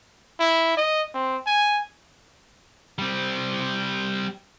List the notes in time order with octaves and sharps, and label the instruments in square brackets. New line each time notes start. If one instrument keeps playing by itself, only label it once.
[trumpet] E4
D#5
C4
G#5
[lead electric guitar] G3 C4